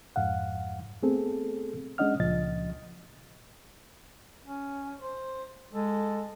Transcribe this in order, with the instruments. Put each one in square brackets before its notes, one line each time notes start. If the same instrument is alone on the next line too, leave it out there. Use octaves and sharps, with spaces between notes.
[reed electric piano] F2 G#2 F5 F#5
A3 B3 C4 G#4 A4
G#3 C#4 D4 D#5 F#5 F6
C#2 A#2 F3 D#5 A6
[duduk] C#4
C5
[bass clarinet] G#3 [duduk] A4